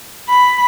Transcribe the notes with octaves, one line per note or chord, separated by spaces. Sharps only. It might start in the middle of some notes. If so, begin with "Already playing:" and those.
B5